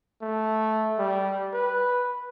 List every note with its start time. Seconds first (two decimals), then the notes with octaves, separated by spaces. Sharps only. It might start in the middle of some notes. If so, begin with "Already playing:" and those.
0.22 A3
0.99 G3
1.54 B4